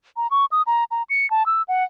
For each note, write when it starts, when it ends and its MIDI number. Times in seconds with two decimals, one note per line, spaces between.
0.17 0.27 82
0.31 0.45 85
0.52 0.62 87
0.67 0.84 82
0.91 1.03 82
1.10 1.29 97
1.31 1.46 81
1.46 1.62 88
1.68 1.84 78